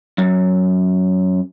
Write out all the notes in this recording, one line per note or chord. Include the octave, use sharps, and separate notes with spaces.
F#2